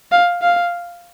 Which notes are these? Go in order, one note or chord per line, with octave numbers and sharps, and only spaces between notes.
F5
F5